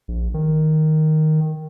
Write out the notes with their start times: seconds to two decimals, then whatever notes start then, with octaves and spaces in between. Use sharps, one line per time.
0.08 A#1
0.34 D#3